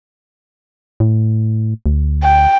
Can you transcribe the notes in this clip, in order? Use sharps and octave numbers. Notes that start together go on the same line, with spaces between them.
A2
D2
G5